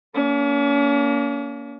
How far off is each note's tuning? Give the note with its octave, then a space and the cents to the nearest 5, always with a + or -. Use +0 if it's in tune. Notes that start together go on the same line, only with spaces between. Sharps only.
A#3 +0 C#4 +40